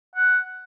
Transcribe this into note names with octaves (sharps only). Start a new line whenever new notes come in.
F#5